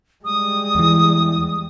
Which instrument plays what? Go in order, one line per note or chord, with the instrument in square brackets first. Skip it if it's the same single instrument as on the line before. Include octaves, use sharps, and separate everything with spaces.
[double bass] G3 G#3 [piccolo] D#6
[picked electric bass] E2 E3